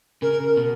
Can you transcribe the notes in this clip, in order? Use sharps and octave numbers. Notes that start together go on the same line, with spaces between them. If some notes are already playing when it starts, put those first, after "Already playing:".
C#3 A#4
A#4
B2